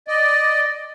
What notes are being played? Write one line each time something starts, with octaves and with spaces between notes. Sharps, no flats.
D5 D#5